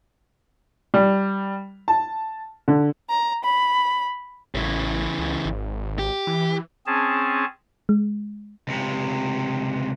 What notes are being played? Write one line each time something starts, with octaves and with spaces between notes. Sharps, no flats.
G3
A5
D3
A#5
B5
A1 C#3 E3
C#2
G#1
G4
E3
C4 C#4 G#4 A5
G#3
C#2 C3